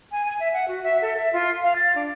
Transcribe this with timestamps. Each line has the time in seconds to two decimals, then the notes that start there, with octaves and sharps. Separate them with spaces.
0.12 G#5
0.26 G#5
0.40 E5
0.53 F#5
0.68 F#4
0.84 E5
1.02 A4
1.17 E5
1.33 F4
1.63 F5
1.76 A6
1.95 D4